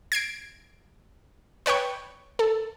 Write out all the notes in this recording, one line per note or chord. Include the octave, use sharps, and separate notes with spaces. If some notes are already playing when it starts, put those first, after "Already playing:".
G#6 C7 D7
B4 C#5 G5 C#6
A4